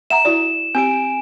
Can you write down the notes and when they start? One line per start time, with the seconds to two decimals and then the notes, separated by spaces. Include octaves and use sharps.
0.10 E5 F#5 A#5 E7
0.25 E4 F#4 D5
0.75 C4 G4 G#5 D7